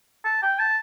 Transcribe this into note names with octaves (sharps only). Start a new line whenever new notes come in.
A5
G5
A5